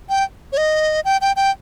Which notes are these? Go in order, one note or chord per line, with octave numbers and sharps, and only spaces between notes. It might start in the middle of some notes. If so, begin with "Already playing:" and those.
G5
C#5
D#5
G5
G5
G5